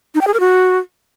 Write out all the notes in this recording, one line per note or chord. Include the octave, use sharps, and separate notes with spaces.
D#4
G5
G#4
A#4
F#4